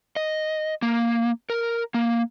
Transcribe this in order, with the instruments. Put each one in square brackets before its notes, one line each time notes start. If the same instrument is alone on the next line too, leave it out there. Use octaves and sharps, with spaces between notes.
[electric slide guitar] D#5
A#3
A#4
A#3